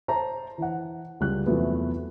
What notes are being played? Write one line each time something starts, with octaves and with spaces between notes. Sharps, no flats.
C5 A5 A#5
E3 F#5
C#2 G3 F#6
E2 C3 F3 F#3 A3 B3